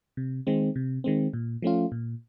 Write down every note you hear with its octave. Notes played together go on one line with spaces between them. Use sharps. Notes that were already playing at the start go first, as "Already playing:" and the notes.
C3
D#3 G#3 C4
C3
D#3 G#3 C4
A#2
F3 A3 C#4 F4
A#2